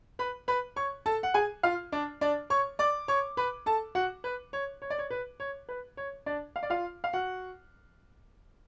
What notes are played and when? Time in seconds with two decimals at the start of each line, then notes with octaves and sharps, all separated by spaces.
0.19 B4 B5
0.48 B4 B5
0.76 C#5 C#6
1.06 A4 A5
1.23 F#5
1.34 G#4 G#5
1.63 F4 F5
1.92 D4 D5
2.21 D4 D5
2.50 C#5 C#6
2.79 D5 D6
3.08 C#5 C#6
3.37 B4 B5
3.66 A4 A5
3.95 F#4 F#5
4.24 B4
4.53 C#5
4.82 C#5
4.90 D5
4.99 C#5
5.10 B4
5.40 C#5
5.69 B4
5.97 C#5
6.26 D4 D5
6.56 F5
6.63 D5
6.70 F4 F5
7.04 F5
7.13 F#4 F#5